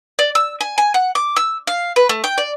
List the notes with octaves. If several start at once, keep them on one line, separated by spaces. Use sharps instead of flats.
D5
E6
G#5
G#5
F#5
D6
E6
F5
B4
A3
G5
D5